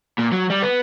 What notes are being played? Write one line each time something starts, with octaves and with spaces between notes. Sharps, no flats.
A#2
F#3
G3
B3